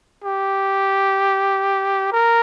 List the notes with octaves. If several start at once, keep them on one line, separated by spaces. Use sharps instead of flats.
G4
A#4